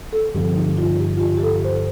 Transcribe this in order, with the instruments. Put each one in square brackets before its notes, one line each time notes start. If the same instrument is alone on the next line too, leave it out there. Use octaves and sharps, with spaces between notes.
[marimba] A4
[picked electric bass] G2 D3 F3 C4 [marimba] G4
[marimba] D#4
F4
G4
F4
G4
G4
A4
C5